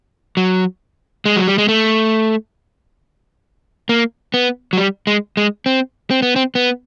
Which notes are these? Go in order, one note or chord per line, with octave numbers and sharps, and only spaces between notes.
F#3
G#3
F#3
G3
G#3
A3
A#3
B3
F#3
G3
G#3
G#3
C4
C4
B3
C4
B3